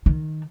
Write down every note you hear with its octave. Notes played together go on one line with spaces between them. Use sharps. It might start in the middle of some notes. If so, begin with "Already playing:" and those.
D#3